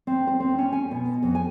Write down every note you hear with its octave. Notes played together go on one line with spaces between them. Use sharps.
C4
C5
C4
C#4
G#5
B2
F2
G#5